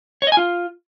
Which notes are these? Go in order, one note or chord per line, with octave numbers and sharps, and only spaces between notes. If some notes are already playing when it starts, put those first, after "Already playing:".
C#5
D#5
G#5
F4